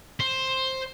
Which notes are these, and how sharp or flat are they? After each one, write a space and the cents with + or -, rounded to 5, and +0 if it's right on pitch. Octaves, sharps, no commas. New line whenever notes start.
C5 +10